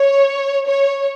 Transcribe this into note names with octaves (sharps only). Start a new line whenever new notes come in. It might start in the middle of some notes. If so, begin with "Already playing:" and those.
Already playing: C#5
C#5